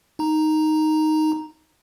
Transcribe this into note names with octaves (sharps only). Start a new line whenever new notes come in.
D#4 A#5